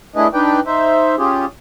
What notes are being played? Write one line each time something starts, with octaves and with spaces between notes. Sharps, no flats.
A3 D4 E4 G#4 B4 D#5
D4 D#4 B4 D5 G5
D#4 C5 E5
C#4 F4 G4 G#4